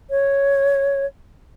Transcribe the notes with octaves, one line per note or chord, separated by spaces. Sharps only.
C#5